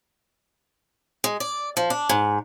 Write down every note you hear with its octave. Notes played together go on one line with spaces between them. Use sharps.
G#3
D5
F3
D4
G#2